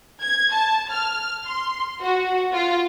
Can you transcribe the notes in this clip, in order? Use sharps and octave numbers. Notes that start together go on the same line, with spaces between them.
G#6
A5
F6
C6
F#4
F4